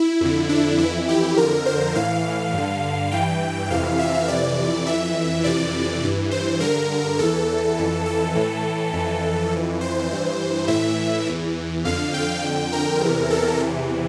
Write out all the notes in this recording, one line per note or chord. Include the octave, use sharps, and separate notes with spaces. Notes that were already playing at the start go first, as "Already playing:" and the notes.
Already playing: E4
F2 D3
D4
F2 E3 E4
G4
F2 D3 A#4
C5
A2 E3 F5
G2 D3
G2 E3 G5
F2 C3 E3 F5
E5
F2 C3 E3 D5
F2 E3 E5
F2 C3 E3 D5
G2 E3
C5
G2 D3 A#4
E2 E3 A4
F2 E3
A4
A2 E3
F2 E3
F2 E3
C5
G2 E3
A2 E3 E5
E2 E3
F2 D3 F5
G5
F2 D3
A#4
E2 C3 E3
A4
E2 C3 E3